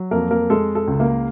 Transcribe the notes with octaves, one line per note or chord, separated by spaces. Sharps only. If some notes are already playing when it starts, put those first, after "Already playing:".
Already playing: F#3
F2 A#3 A#4
A#3 A#4
G#3 A4
A4
C#2
A#3 A#4